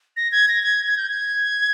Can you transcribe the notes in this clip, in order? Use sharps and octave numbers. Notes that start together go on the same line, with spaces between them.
A#6
G#6
A#6
G#6
G#6
G6
G#6